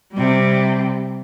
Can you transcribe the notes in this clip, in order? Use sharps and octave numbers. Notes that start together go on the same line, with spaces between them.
C3 G3